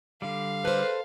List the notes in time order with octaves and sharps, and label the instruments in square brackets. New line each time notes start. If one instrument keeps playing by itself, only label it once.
[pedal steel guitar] D3 G3 [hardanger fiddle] F5
[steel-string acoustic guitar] A4 C5 [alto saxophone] B4